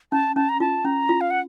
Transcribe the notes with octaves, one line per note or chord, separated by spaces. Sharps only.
C#4 A5
C#4 A5
A#5
F4 A5
C#4 A#5
F4
F5
F#5